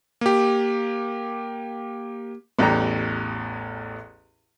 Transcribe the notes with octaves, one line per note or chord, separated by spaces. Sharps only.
A#3 G4
A1 E2 G3 G5 A#5